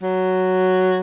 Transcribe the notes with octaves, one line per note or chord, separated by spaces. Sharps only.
F#3